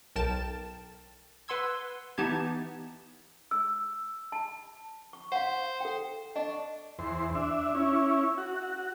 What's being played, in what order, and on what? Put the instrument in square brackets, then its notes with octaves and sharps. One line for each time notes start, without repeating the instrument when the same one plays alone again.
[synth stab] B1 A#4 G5 A5 A6 E7
B4 F#5 C6 E6 G#6
E3 B3 D#4 G4 A5 G#6
[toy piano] E6
A5
C#6
[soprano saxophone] C5 [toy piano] F5 F#5
[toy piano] A4 G5
[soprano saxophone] D4 [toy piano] D#5 C#6
[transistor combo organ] E2 C5
D4 E5
C#4 E4
F#4